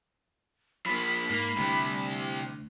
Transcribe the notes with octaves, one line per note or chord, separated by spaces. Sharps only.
F3 A#3 B5
G#2 A#3
D2 C3 G3